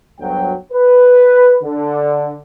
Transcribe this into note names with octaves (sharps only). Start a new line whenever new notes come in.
G1 D2 F#3 G5
B4
D3